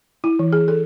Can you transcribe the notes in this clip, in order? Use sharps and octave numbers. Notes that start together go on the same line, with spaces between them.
E4
E3
G#4
A4